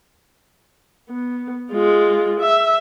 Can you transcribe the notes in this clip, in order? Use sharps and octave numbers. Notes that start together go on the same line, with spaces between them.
B3
G#3 F4
E5